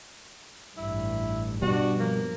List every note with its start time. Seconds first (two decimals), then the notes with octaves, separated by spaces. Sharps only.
0.77 A1 G2 E4
1.62 G2 B2 G3 D4 F#4
2.00 F3 A#3